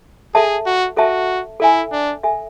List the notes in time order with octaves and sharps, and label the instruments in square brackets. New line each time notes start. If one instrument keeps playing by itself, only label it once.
[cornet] G#4 [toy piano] A4 E5 A5
[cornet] F#4
[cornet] F#4 [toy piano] A4 E5 A5
[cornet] E4 [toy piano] A4 E5 G#5
[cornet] D4
[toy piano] A4 E5 G#5